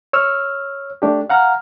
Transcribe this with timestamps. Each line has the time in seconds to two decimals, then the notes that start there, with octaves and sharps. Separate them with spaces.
0.13 C#5 E6 F6
1.02 A3 D4 G4
1.30 F5 F#5 A#5 F6